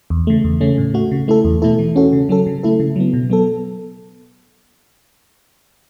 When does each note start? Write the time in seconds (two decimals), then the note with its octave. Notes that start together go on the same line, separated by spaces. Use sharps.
0.10 E2
0.27 C#3 A3
0.44 E2
0.61 C#3 A3 C#4
0.78 A2
0.94 A3 F#4
1.11 C#3
1.28 A3 E4 A4
1.45 E2
1.62 B2 A3 E4 A4
1.79 E3
1.96 C#4 F#4 A4
2.12 C#3
2.29 F#3 C#4 A4
2.46 C#3
2.63 A3 E4 A4
2.80 C#3
2.96 F#3 B3
3.14 B2
3.30 F#3 B3 A4